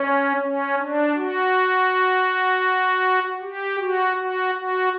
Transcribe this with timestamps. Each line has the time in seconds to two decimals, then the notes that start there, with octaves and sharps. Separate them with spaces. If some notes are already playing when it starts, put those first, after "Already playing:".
Already playing: C#4
0.41 C#4
0.78 D4
1.16 F#4
3.43 G4
3.80 F#4
4.17 F#4
4.55 F#4